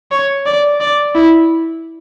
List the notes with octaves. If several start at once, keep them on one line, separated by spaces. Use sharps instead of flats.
C#5
D5
D5
E4